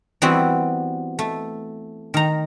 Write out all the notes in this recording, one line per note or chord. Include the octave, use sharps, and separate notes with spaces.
E3 G3 B3 C4 F#4
A3
D#3 A#5